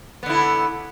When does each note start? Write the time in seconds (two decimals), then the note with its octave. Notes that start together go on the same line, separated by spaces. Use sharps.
0.23 B3
0.26 D3
0.29 E4